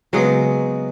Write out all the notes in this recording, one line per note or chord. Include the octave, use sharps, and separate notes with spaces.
C#3 F#3 G#3 B3 C4